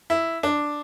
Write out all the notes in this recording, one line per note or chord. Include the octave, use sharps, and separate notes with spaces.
E4
D4